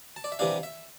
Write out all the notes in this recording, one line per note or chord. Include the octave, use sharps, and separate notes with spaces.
A5
D5
E5
C3 E3 G3 D4 F5
E5